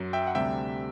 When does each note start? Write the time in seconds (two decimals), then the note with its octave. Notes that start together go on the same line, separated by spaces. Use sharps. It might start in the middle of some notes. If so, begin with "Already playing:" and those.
Already playing: F#2 F#3
0.13 E5 G5
0.27 F#5
0.35 D2 C3 G3 E5 G5